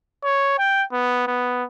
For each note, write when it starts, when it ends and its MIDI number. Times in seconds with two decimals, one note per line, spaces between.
0.24 0.55 73
0.58 0.83 79
0.92 1.26 59
1.27 1.64 59